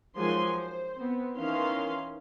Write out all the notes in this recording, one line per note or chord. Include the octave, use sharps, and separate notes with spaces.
D#3 F3 F#3 G#3 G#5 C6
C5
B3 C4
D#3 E3 C#4 F5 C6